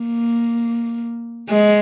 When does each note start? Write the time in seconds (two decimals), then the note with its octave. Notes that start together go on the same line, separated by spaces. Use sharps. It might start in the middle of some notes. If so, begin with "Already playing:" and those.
Already playing: A#3
1.50 G#3